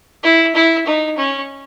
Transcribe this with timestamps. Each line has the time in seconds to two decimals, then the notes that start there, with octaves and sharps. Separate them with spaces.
0.23 E4
0.55 E4
0.86 D#4
1.17 C#4